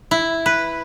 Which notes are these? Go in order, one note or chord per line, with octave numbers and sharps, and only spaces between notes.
E4
B4